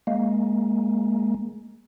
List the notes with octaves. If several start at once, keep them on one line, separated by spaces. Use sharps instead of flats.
G#3 A#3